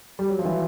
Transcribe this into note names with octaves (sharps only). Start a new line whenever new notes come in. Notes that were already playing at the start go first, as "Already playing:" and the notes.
G3
F#3
F3
E3